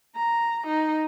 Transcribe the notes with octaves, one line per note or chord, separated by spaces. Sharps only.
A#5
D#4